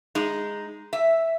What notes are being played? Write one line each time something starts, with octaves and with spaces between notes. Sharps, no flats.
G#3 D#4
E5